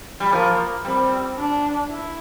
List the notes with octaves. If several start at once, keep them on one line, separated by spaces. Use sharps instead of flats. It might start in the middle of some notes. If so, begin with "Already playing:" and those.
G3
F3 A#3
G3 C4
D4
E4